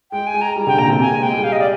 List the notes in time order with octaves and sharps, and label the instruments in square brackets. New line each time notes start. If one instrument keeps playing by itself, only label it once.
[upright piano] G#3 [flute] G5
[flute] G#5
[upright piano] G#3
[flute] A#5
[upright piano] G3
[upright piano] D3 [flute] G5
[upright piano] A#2 [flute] A#5
[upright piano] D3
C3
[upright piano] A#3 [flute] G#5
[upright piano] G#3
[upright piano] G#3 [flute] G5
[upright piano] G3
[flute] F5
D#5
D5